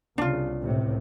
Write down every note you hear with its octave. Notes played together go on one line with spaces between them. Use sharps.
C2 C#3 D4 F4
C#2 A2 C3